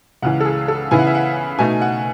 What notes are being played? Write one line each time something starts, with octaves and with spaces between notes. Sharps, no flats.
C#2 C#3 E3 F#5
A4
G#4
A4
C#3 E3 B3 E4 G#5
F#5
E5
F#5
B2 A3 D#4 G#5
F#5